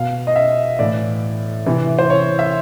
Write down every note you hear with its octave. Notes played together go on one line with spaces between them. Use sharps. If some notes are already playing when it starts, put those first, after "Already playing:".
Already playing: B2 F5
D#5
E5
A2 E3 D5
C3 E3
C5
C#5
E5